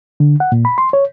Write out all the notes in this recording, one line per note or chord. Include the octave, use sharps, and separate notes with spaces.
D3
F#5
A#2
B5
C6
C#5